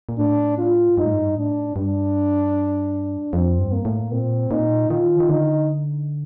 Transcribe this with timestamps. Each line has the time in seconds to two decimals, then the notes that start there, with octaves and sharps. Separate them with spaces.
0.09 A#2
0.19 A2 D4
0.58 F4
0.98 G2 D#4
1.05 A2
1.13 G2
1.37 A2 D4
1.76 G2 D4
3.33 F2 C4
3.59 G2
3.73 A#3
3.85 A2
4.12 A#2 C4
4.51 A#2 D#4
4.90 D#3 F4
5.20 D#3
5.29 D3 D#4